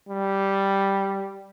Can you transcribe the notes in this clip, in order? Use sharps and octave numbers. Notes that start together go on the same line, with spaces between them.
G3